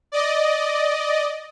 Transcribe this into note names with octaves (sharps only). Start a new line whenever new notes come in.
D5 D#5